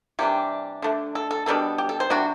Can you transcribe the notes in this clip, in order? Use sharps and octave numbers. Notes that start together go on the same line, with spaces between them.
C3 E3 G3 D4 G4
D3 A3 D4
A4
A4
B2 G3 B3 D4 A4
G4
A4
C5
C3 G3 D4 F#4